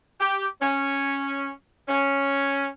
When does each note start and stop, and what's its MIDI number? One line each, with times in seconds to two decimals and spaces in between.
0.20 0.47 67
0.61 1.49 61
1.87 2.67 61